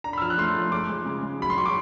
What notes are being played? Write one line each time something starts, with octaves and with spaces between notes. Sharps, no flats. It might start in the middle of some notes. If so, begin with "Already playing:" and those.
D4 A#5
B5
E6
F3 F6
F#6
A3 C6
F3
G#3 D6
G#3
C#3
G#3
F#3 B5
C6
F#3 C#6
D6